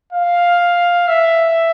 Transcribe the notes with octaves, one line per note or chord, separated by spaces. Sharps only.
F5
E5